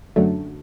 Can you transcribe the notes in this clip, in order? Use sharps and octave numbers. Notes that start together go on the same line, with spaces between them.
F#2 D3 F#3 A3